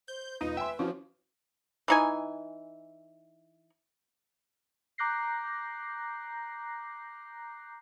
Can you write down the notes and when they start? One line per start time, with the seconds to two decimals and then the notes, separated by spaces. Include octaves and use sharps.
0.08 C5 G6
0.41 E1 D#4 F4 B4 D#7
0.57 E5 G5 G#5 C6
0.79 F3 C#4 E4 F#4
1.88 E3 D#4 G#5
4.98 A#5 D6 F#6 G6 A#6 C7